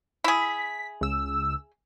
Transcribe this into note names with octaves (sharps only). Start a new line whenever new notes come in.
E4 G#4 B6
C#2 E6